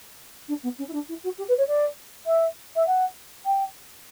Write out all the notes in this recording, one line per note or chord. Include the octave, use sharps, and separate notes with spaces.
D4
B3
C#4
E4
D4
E4
F#4
G4
B4
C#5
D5
E5
E5
F#5
G5